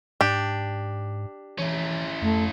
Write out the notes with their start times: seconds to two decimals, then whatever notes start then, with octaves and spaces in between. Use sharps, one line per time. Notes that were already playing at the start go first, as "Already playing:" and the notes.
0.21 G#2 D4 G4
1.58 E3 C#4 E4
2.22 F2 A3